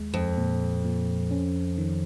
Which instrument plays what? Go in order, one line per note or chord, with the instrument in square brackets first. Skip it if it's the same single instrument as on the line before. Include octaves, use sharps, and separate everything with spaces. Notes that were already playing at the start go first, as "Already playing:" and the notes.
Already playing: [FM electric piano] D#2 G#3
[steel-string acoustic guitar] F2
[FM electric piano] A#2
A#2
C#4
D#3